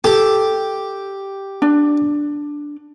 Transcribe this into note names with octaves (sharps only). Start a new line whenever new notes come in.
G4 A4
D4